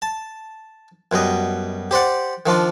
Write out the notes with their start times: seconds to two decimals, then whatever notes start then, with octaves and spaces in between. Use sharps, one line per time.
0.02 A5
1.12 F#2 B2 G3 D#5
1.91 G4 C5 D5 F#5
2.46 D#3 F3 D4 F4